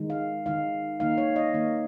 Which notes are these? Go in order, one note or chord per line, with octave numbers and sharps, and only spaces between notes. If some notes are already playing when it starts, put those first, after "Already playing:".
Already playing: D#3 G#3 D#4
F5
D#3 G#3 D#4 F5
D#3 A#3 D#4 F5
C#5
D#5
D#3 A#3 D#4